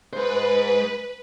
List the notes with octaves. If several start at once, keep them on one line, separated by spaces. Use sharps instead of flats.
G#3 B4 C5